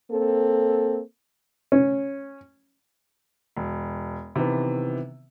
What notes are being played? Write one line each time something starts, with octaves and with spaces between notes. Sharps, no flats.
A#3 C4 A4
C#4
E1
C3 D#3 E3 B3